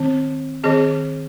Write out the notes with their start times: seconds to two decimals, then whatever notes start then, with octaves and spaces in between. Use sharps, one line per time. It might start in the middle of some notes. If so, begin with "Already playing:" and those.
Already playing: D#3 C4
0.64 D#3 C4 G#4 D#5